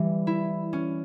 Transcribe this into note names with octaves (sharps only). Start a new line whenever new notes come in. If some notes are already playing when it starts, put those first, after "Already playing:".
Already playing: E3 G3
E4
C#4